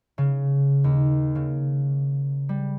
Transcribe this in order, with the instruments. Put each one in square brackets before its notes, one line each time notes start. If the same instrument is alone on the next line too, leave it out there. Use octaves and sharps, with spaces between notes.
[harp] C#3
D#2
C#3
G3